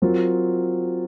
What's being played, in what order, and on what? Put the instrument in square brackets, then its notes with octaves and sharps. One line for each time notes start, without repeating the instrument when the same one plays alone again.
[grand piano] F#3 C4 F4 A#4